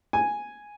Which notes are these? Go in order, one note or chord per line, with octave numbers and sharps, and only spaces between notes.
G#5